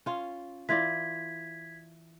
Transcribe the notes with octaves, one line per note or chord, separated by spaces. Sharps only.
C#4 F4
E3 F4 D5 G#6 B6